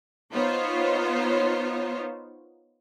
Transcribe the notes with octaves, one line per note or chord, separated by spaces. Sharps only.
B3 D#4 F4 C5 C#5